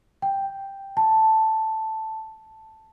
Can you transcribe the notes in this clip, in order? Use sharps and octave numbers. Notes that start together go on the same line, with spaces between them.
G5
A5